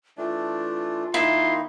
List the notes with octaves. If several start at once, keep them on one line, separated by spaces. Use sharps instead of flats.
E3 A3 D4 F4
D#3 A#3 D#4 E4 C6